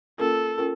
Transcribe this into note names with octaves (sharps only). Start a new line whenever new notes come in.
A#3 C#4 F4 A4 A#4
C#4 F4 A#4